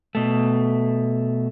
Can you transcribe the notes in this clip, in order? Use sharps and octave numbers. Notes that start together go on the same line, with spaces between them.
B2 A3